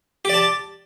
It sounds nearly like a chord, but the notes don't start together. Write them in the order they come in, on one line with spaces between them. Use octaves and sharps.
G4 D5 A5